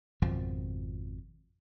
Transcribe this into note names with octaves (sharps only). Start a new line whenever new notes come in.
G#1 F2 B2 F3